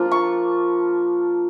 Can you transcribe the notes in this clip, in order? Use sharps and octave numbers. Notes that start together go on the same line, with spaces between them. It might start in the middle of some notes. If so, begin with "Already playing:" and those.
Already playing: F3 A#3 D4 F4
C#6